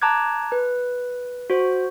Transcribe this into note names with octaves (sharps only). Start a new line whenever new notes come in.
A5 A#5 D6 F#6 G#6
B4
F#4 C5